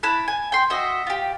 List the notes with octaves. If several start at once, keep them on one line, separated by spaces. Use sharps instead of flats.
E4 A5 B5 F#6
G#5
G5 C6
F#4 D#5 E5
F4 G4